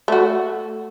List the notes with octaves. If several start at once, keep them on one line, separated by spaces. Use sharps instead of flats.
A3 F#4